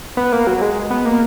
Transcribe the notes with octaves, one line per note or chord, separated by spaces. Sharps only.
B3
A#3
F#3
G#3
B3
A#3